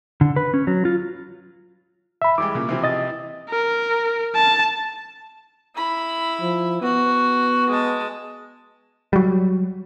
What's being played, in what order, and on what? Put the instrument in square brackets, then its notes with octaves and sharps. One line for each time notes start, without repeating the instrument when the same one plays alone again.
[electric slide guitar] D3
B4
C#4
F#3
F4
[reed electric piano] E5 B5
[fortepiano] E3 G3 G#3 [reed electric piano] D6
[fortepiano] A#2 C#3 A#3
C3 E3 F3
[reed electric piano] D#5 A6
[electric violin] A#4
A5
[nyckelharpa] E4 B5
[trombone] F3
[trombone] B3 [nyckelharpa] F#4
[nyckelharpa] G#3 A5
[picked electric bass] F#3 G3